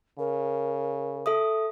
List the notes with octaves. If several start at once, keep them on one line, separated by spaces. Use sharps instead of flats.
C#3 A#4
A4 E5 D#6